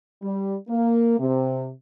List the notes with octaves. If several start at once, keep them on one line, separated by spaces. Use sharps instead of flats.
G3
A#3
C3